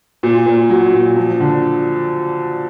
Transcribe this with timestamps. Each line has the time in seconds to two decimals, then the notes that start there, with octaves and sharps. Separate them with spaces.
0.23 A#2
0.46 A#2
0.70 F#3
0.94 A#2
1.16 F3
1.40 D3